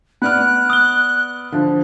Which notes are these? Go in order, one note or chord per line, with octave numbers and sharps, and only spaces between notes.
B3 D5 F6 F#6
D#6 G7
D3 F3